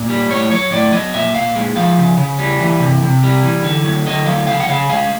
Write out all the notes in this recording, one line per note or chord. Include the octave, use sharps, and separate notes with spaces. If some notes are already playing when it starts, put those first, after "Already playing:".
Already playing: A#2
G3
A2 C#5
F#3 C#5
A2 D5
F#3 D#5
A#2 E5
A#2 F5
G#3
F3 F5
C#3
C#3
G3
E3
C3
C3
G3
E3
D3
F#3
D3 D#5
F#3 F5
C#3 F5
F#5
C#3 F5
G#3 F5